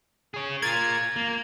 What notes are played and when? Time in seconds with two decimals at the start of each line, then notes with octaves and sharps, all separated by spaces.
0.34 G#4 C#5
0.62 F4 A#4 G#6 A6
1.16 A#3